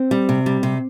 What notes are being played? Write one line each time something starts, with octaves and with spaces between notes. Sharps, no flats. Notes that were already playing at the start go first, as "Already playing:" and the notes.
Already playing: C4
G3
C3
G3
C3